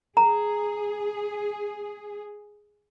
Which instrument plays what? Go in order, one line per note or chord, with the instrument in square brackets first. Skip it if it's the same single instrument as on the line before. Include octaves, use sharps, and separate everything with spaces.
[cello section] G#4 [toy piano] A#5